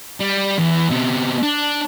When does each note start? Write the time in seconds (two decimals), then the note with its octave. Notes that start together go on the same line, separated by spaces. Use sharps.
0.20 G3
0.58 E2
0.91 B2 C4
1.43 D4